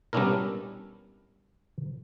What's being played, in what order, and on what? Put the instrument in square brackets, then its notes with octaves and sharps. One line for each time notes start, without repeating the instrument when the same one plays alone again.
[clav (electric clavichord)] G3 B3 C#4 D4 E4 A#4